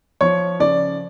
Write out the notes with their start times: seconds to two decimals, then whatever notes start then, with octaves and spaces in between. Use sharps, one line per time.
0.21 F3 C#5
0.60 C#3 D5